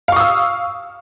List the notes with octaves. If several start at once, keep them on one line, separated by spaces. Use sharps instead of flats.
F5 C#6 D#6 E6